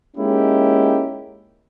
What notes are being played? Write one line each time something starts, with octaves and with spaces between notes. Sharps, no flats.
G#3 A#3 C#4 D#4 E4 G4